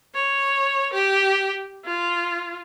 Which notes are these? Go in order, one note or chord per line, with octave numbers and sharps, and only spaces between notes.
C#5
G4
F4